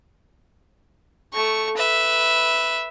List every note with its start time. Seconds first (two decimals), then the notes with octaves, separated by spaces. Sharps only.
1.33 A3 C#6
1.77 B4 E5